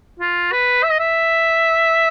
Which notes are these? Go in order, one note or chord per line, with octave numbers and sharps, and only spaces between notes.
F4
B4
E5
D#5
E5